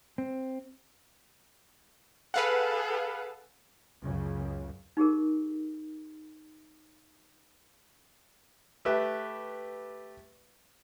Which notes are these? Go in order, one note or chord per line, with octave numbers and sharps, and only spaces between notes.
C4
G#4 A4 B4 F5 F#5
C#2 F#2 C#3
D#4 G4 G#4 A#4
A3 G4 B4 E5